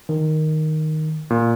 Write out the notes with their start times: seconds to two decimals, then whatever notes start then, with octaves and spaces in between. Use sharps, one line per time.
0.09 D#3
1.30 A#2